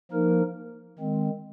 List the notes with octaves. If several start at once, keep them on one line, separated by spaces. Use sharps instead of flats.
F3 A#3 D#4 A#4
D#3 G#3 C4